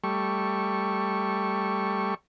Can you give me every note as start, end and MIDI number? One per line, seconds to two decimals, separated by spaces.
0.04 2.14 55
0.04 2.14 57
0.04 2.14 85